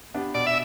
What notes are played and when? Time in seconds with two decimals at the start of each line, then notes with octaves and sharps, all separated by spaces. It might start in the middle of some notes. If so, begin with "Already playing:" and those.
0.14 B3 D4 G4
0.34 B2 D5
0.46 E5